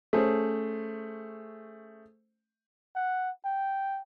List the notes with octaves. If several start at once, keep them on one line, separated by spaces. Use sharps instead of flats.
A3 C#4 G#4 C5
F#5
G5